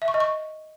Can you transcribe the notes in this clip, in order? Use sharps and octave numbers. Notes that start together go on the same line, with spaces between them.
E5
C#6
D#5
C#6